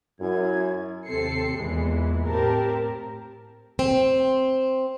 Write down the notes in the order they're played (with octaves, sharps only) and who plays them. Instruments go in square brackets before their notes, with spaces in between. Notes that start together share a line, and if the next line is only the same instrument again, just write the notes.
[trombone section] F#2 [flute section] E4 G#6
[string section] D#2 C3 C4 A4 C7 C#7
E2 A#2 E3 G#3
A2 C4 G4 A#4 A5
[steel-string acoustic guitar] C4